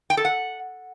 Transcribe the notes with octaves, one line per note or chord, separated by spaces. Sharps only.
G5
A4
F#5